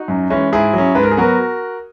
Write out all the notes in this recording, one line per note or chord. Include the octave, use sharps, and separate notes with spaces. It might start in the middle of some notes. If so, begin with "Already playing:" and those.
Already playing: D#4 F#4
F#2
E3 G#3 C#4
G#2 E4 G#4
F#3 C#4
G#2 B4
A#4
G#4
F#3 B3 F#4 A#4